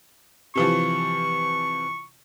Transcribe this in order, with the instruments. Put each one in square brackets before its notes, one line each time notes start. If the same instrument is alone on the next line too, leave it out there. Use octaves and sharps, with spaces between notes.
[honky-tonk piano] C3 E3 F3 [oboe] C#6